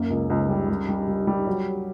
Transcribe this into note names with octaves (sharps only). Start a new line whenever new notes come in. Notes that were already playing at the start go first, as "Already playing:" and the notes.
Already playing: F#2 A#3
C#2
C#2
G3
G3
G3
G3
G3
F#3